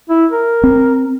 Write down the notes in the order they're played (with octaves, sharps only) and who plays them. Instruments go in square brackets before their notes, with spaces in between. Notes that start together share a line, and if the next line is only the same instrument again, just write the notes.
[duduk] E4
A#4
[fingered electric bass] C4